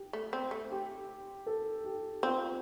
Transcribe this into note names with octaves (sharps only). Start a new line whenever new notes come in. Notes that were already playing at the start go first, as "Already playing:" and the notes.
Already playing: G4
A3
C4
A3
G4
A4
G4
C4 F4